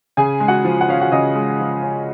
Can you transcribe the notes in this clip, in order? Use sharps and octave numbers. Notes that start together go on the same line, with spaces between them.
C#3 G#4 G#5
G#3
F#4 F#5
F3
F#5
C#4 F5
F#4 F#5
C#3 D#5 D#6
G#3
F3
C#4